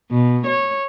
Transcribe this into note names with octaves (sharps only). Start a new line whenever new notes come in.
B2
C#5